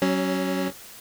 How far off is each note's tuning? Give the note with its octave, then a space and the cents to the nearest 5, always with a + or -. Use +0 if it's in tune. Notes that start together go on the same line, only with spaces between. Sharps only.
F#3 +25 C#4 -5